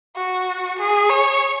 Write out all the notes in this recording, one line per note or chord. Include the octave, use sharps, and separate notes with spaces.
F#4
G#4
C#5